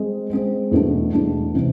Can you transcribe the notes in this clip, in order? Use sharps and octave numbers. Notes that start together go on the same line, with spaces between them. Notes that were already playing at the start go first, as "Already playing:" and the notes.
Already playing: G#3 C4 G#4
G#3 C4 G#4
E2 B2 A3 D4
E2 B2 A3 D4
C3 E3 G#3 C4